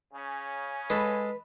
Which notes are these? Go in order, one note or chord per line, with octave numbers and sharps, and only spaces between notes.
C#3 C#4
G#3 A4 B4